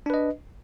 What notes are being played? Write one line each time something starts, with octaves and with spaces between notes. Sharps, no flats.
D4 B4 D#5